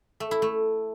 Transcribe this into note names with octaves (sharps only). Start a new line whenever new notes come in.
A3
E4
A3